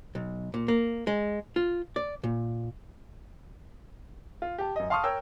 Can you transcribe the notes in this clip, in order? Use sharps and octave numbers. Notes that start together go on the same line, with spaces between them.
B1
A#2
A#3
G#3
F4
D5
A#2
F4
G4 A5
F#2 D#5
F5 A5 C6 C#6 D#6 F6
A#4 C#5 G5 E6